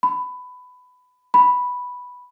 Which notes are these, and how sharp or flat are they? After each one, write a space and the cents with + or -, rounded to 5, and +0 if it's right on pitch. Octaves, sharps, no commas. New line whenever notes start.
B5 +15
B5 -5